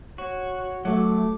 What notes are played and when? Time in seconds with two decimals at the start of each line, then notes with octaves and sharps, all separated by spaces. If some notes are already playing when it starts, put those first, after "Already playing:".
0.18 F#4 C#5
0.85 F#3 A3 D6